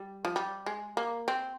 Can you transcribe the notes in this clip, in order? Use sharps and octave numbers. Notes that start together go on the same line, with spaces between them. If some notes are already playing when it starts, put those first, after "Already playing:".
Already playing: G3
F3
G3
G#3
A#3
C4